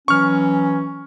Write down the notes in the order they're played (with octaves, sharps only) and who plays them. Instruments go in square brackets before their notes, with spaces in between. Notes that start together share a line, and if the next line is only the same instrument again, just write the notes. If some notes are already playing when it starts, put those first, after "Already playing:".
[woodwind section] E3 F#3 C#4 [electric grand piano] C#6 F6